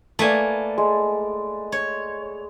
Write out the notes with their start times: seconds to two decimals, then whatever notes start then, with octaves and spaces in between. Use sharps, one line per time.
0.19 A3 A#3 B4 D5 G#5
0.78 G#3
1.72 C#5